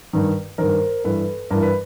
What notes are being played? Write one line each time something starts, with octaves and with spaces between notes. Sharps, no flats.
G2 D#3
G2 D#3 A#4 C5
G2 E3 A4 B4
G2 E3 A#4
B4